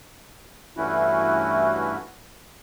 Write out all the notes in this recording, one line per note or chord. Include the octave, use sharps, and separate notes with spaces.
G2 E3 A3 C#4 E4 F#4